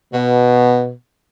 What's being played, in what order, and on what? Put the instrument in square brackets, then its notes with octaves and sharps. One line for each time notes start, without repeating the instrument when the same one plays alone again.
[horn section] B2